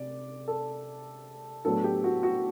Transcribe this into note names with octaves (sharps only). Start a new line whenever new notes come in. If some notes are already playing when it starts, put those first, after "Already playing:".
Already playing: C3 D5
A4
A2 F#3 B3 D4 A4
G4
F#4
F#4